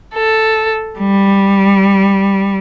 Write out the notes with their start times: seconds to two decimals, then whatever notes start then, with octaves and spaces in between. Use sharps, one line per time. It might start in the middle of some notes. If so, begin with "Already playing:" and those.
0.14 A4
0.99 G3